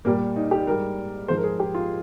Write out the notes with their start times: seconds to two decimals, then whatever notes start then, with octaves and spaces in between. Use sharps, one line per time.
0.05 A#2 G3 A#3
0.36 D#4
0.51 G4
0.67 G#2 G3 A#4
1.28 G#2 F3 G#3 C5
1.37 A#4
1.44 G#4
1.60 G4
1.75 F4